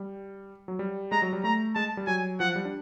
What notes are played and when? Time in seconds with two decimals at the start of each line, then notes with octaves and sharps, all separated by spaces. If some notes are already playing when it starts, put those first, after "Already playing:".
Already playing: G3
0.68 F#3
0.79 G3
1.12 G#3 A#5
1.22 F#3
1.33 G3
1.44 A3 A#5
1.75 G#3 A5
1.97 G3
2.07 F#3 G#5
2.40 F3 F#5
2.56 G3
2.65 D4